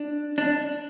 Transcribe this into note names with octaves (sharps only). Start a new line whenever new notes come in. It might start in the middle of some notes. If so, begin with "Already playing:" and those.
Already playing: D4
D4